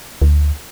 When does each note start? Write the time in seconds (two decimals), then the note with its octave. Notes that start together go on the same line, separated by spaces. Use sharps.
0.22 D2